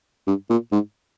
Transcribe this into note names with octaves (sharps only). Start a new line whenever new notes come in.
G2
A#2
G#2